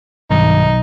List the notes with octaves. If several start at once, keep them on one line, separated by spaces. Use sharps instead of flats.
B1 G2 D#3 D#4